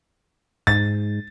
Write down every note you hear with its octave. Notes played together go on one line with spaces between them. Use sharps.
G#2 A6